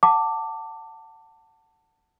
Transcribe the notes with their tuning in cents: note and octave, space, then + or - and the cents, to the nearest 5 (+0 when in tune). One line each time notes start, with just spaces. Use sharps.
F#5 +0 A5 +20 D6 +0